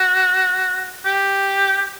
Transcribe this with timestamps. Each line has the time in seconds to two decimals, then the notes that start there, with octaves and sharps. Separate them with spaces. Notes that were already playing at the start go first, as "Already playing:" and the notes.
Already playing: F#4
1.05 G4